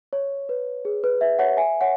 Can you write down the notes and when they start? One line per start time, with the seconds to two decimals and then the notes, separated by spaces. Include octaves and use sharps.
0.13 C#5
0.49 B4
0.85 G#4
1.04 B4
1.21 B4 E5
1.39 C#5 F#5
1.57 E5 G#5
1.81 C#5 F#5